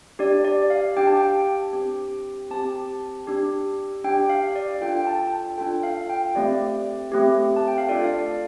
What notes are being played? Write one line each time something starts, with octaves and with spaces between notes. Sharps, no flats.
D4 G4 D5
D5
F5
D4 G4 G5
A5
G5
C4 G4
C4 G4 A5
D4 G4
D4 G4 G5
F5
D5
D4 F4 A4 G5
G5
A5
A5
G5
D4 F4 A4 G5
F5
G5
A3 C4 G4 D5
A3 C4 G4
A5
G5
F5
D4 F4 A4 D5
F5
D5